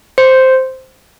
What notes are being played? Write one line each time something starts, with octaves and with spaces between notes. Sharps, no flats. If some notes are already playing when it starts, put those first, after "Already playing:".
C5